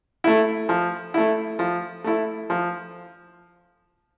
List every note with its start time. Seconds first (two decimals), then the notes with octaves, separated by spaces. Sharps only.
0.24 A3 E4
0.69 F3
1.14 A3 E4
1.59 F3
2.04 A3 E4
2.50 F3